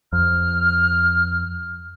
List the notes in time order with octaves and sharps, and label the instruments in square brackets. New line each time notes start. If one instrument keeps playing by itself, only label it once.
[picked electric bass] F2 [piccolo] F6